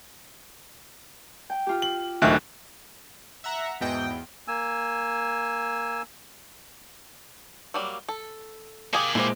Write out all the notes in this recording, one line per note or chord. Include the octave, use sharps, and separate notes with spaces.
G5
F4 G4
F#7
D1 D2 D#3 E5 F#6
E5 F#5 A#5
E2 G#2 B2 E3 D#5 G5
E2
A#3 G#5 E6
F#3 G3 A#3
A4
A#3 G4 G#4 F5 G#5
A#2 G#3 E4 F4 G4 C5